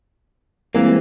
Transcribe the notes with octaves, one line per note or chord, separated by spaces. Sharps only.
E3 G3 G#3 A#3 C4